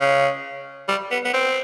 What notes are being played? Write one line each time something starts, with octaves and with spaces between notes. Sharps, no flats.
C#3
G3
B3
B3
C4